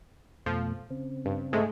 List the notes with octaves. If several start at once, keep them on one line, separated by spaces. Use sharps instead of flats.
F2 B2 F3 A3
C#3 C4
G2
G#2 G#3 A3